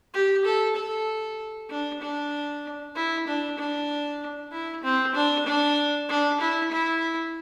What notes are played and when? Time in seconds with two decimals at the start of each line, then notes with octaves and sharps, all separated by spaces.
0.14 G4
0.45 A4
0.76 A4
1.70 D4
2.02 D4
2.96 E4
3.27 D4
3.59 D4
4.52 E4
4.83 C4
5.15 D4
5.46 D4
6.09 D4
6.41 E4
6.72 E4